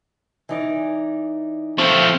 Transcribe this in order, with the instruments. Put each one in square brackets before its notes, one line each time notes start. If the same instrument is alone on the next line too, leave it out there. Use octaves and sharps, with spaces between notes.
[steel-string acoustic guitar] E3 D#4 D5
[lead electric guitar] F3 A3 [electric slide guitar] C4 [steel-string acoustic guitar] F4